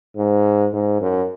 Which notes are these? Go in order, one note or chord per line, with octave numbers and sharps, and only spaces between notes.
G#2
G#2
F#2